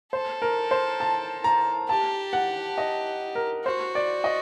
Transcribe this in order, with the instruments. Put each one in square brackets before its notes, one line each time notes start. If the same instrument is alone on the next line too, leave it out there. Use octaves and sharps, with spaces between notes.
[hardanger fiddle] A4 [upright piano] C5
[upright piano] A#4
C5
A5
A#5
[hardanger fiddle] G4 [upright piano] A5
[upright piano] F#5
D#5
A#4
[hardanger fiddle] F#4 [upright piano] C5
[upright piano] D5
D#5